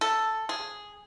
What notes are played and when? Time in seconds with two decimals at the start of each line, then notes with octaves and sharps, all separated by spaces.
0.01 A4
0.49 G#4